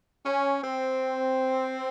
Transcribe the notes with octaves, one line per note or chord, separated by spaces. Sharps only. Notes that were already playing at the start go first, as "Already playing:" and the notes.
C#4
C4